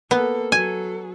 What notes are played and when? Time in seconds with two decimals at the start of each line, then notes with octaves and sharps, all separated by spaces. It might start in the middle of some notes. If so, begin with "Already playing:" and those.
0.11 A#3 B3 A4
0.52 F#3 A4 G#5